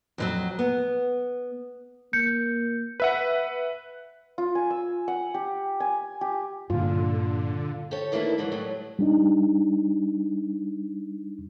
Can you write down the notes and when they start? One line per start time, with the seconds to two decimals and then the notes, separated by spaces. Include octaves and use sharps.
0.18 F2 E3 F#3
0.59 B3
2.13 A#3 G6 C#7
3.00 B4 E5 F#5
4.38 F4
4.55 G#5
4.70 E6
5.08 F#5
5.34 G4
5.80 G#5
6.21 G4
6.70 G2 A#2 D3 F4
7.91 G4 A4 C#5
8.12 D#3 E3 A3 A#3 D4 E4
8.38 G#2 D3 E3 F#3
8.52 A2 F#3 G3 A4
8.99 G3 D4 D#4